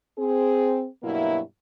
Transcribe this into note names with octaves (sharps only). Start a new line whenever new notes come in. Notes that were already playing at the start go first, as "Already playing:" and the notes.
C4 G#4
G2 B2 F#3 A#3 E4